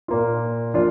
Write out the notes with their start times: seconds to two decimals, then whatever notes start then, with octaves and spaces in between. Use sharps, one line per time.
0.08 A#2 A#3 F4
0.74 A#2 F3 D4 F4